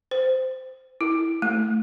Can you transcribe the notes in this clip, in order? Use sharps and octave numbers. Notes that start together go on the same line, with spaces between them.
C5
E4
A3